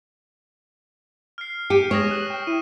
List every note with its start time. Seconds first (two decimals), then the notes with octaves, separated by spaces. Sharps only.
1.38 F6 C7
1.70 G4 C#7 D#7
1.91 G#3 C#5 C#6 D#6 A#6
2.11 F#6
2.30 G5
2.47 E4 D#7